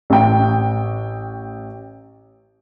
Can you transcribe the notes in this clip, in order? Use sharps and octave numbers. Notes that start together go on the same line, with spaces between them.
A1 G5